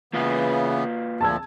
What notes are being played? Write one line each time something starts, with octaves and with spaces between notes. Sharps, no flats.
C#3 E3 A#3 B3 F4 B4
D2 A#2 F3 A5 E6 G#6